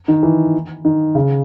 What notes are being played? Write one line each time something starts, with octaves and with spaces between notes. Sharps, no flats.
D#3
E3
D#3
C#3